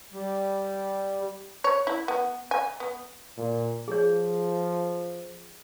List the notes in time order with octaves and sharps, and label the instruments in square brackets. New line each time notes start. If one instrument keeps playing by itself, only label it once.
[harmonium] G3
[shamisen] C#5
E4
B3
G#5
B3
[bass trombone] A#2
[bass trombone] F3 [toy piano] G#4 C#5